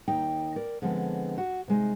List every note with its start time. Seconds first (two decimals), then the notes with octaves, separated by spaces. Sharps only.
0.08 D#2 D#4 G5
0.56 A#4 D5
0.82 D3 F3 G#3 B3 C4
1.38 F#4
1.68 C3 G#3 D#4